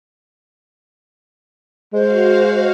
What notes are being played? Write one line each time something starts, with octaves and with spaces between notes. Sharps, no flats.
G#3 F#4 C5 F5